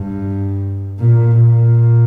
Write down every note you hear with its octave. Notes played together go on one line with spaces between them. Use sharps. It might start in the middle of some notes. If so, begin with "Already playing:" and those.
Already playing: G2
A#2
A#2